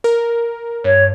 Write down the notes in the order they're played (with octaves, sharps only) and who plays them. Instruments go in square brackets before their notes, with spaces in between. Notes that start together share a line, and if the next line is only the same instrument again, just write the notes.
[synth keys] A#4
[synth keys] G2 [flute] C#5